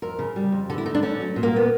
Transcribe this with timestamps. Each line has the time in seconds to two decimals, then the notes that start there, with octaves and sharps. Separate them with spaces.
0.02 F2 A#4
0.19 C#3
0.36 G3
0.52 F2
0.70 D3 A4
0.78 E4
0.85 A3 D#4
0.95 D4
1.02 A3 C#4
1.20 F#3
1.36 A#2
1.43 A#3
1.53 A#2 B3